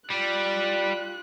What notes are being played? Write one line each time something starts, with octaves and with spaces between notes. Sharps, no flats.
G3 F4 D5 F#6